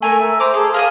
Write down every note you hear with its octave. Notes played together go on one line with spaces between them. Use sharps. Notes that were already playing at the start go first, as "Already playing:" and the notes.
A3 A#4 G#5
E5
C5 A#5 D6
G#4 A4
A#4 F5 G#5 D#6